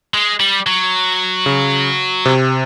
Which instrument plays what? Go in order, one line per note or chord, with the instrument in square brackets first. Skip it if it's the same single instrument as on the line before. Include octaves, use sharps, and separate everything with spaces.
[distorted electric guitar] G#3
G3
F#3
[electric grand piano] C#3
C3